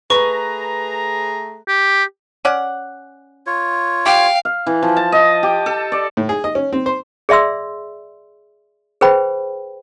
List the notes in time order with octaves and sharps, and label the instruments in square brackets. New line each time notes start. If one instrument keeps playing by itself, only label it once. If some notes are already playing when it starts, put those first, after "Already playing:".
[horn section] A3 G#4 A#5 [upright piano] B4 [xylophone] C#6
[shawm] G4
[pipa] C#4 D5 F#5
[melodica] F4 C#5
[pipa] G4 [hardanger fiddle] F5 [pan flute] G5
[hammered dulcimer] F5
E3
F3
A5
D#5
G4
A4
D5
[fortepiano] A2
G#4
D#5
C#4
C4
C5
[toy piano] G#4 D5 E5 C6 E6
G#4 B4 C5 G5 B5